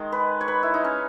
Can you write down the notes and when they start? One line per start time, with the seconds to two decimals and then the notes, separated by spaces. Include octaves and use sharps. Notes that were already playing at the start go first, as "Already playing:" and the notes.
Already playing: D#3 G#3
0.12 B4
0.41 C#5
0.48 B4
0.63 E4
0.74 D#4
0.84 C#4